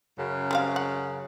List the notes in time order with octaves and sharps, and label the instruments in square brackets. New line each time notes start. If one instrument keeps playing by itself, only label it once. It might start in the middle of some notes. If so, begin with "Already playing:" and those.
[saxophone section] F#2 C#3
[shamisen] G3 C4 F5
F#5